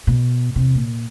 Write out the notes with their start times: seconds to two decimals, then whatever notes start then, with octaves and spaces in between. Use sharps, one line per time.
0.07 B2
0.56 E2 C3
0.75 A#2